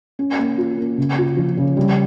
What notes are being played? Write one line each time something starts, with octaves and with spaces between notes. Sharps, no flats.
C#4
A#3
F4
A#3
C#3
F4
F3
C#3
G3